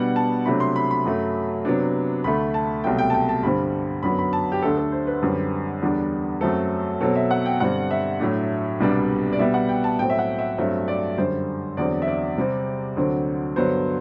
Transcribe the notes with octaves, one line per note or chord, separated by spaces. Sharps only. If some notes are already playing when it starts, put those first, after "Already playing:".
Already playing: B2 G3 B3 D4 F#5
A5
C3 F#3 A3 D4 B5
C6
B5
B5
F#2 F#3 A3
C3 F#3 B3 D4
D2 D3 A3 B5
A5
C2 B2 F#3 A3 G5
G5
A5
G5
A5
G2 D3 G3 C4 B5
F#2 D3 F#3 B3 B5
B5
A5
G4
D2 D3 A3 D4 A4
A4
C5
B4
F#2 D3 G3 C4
E2 D3 G3 D4
F#2 F#3 A3 C4 A4
B2 F#3 C4 A4
E5
F#5
G5
G2 D3 G3 C4 F#5
E5
A2 F#3 A3 D4
C2 B2 G3 B3 D4
D5
B2 G3 B3 E5
F#5
G5
A5
A2 F#3 C4 G5
E5
F#5
E5
G2 F#3 A3 C4 E5
D5
F#2 D3 G3 C5
E2 D3 F#3 C4 D5
E5
D5
C3 G3 C4
D2 D3 F#3 C4
G2 D3 F#3 B3 C5